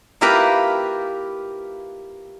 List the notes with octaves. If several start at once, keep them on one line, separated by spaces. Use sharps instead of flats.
A#3 E4 F4 G4 A#4 B4